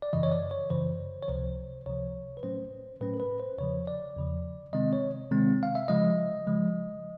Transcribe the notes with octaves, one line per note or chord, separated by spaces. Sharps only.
D5
F#2 C#3 E3 D#5
C#5
D5
C#5
F#2 C#3 E3 C5
C#5
C#2 C3 F3 C5
C#2 C3 F3 C#5
B4
A2 F#3 A3 C#4 C5
A2 F#3 A3 C#4 B4
A#4
B4
C5
E2 C#3 F3 C#5
D5
E2 C#3 F3
C3 D#3 G#3 C4 D#5
C#5
C3 D#3 G#3 C4
F5
E5
C#3 F3 G#3 D#5
C#3 F3 G#3